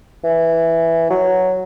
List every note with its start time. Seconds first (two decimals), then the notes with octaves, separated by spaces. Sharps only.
0.24 E3
1.10 F#3